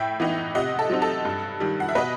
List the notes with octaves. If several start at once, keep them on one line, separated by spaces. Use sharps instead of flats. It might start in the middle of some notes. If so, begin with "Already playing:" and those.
Already playing: A2 E5 G5
E3 B3 D#4
C3 D#5 F#5
A4
F#3 C4 D#4
A4
G2
D#3 G3
F#5
E5
B2 B4 D#5